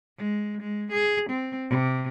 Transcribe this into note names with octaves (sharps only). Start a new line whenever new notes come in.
G#3
G#3
G#4
C4
C3